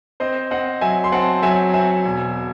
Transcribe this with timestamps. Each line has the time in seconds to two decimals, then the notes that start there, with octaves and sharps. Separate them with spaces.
0.20 C4 C5 D#5
0.51 C4 D#5 F#5
0.81 F#3 E5 G#5
1.04 C6
1.12 C4 F#5 A5
1.43 F#3 E5 G#5
1.74 C4 E5 G#5
2.05 E1